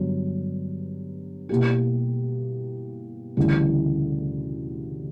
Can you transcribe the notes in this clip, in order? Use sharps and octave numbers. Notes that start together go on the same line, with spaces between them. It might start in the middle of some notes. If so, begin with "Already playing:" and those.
Already playing: G2 D3 F#3 B3
B2 A#3 E4 G4
D2 C#3 E3 G3